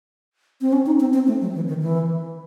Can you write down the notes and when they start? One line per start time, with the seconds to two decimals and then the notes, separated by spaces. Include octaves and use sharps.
0.61 C4
0.73 C#4
0.86 D#4
1.00 C4
1.14 C4
1.27 A3
1.41 F#3
1.55 E3
1.68 D#3
1.82 E3